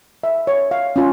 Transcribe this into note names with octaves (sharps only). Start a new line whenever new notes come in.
E5
C#5
F5
C#4 F4